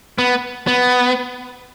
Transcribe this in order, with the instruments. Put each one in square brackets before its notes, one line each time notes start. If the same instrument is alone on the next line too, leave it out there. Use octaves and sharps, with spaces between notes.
[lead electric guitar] B3
B3